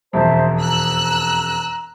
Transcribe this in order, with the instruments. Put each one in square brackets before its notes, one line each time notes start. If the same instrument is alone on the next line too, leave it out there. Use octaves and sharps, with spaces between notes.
[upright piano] E1 F2 [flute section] C5 E5 A5
[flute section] A#5 [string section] E6 F#6